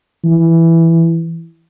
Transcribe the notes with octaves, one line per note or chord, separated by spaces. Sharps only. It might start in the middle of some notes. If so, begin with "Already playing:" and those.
E3